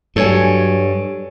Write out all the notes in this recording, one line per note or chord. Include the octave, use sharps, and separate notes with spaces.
G2 F#3 A4 C#5 G#5